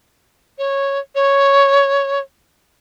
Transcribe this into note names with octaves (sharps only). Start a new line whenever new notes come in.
C#5
C#5